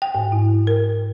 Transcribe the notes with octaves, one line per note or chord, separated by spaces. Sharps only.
G5
G#2
E4
A#4